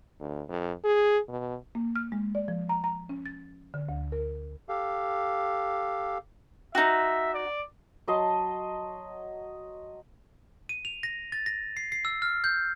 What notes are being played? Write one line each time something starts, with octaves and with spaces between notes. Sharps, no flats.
D2
F2
G#4
B2
A#3
F6
G#3
D5
F3
A#5
A#5
C#4
A6
D3
D2
A#4
G4 A4 F5
D#4 F#4 E5
D5
F#3 D#5 A5 C6
D#7
F7
A#6
A6
A#6
C7
C7
E6
F6
G6